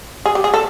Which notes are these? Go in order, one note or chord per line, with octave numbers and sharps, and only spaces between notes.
G#4
G4
G#4
A4